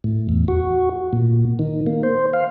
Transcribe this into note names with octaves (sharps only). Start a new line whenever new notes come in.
A2
E2
F#4
A#2
D#3
A#3
C5
F5